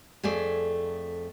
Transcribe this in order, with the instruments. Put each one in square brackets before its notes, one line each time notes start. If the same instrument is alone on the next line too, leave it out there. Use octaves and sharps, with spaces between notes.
[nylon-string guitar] F2 A3 G#4 D5